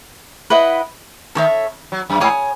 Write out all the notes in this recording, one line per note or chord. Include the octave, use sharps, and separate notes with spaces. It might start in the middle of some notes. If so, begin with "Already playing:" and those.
E4 B4 D#5 F#5
D#3 A4 C#5 E5
F#3
F#2
G#2 C#5 G#5 D#6